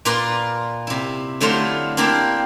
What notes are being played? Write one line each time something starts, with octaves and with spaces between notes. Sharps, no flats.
A#2 F4 A#4 B4 D5 C6
C3 E4
D3 F#3 A3 E4 F4 C5
A#3 C4 D4 E4 F4 G4